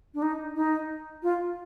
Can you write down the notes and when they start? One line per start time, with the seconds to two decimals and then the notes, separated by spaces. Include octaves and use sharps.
0.14 D4
0.22 D#4
0.56 D#4
1.23 F4